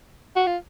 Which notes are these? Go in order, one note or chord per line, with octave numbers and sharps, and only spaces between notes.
F#4
F4